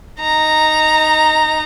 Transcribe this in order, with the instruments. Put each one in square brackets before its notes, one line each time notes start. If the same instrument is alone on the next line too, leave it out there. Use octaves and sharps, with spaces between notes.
[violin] D#4 A#5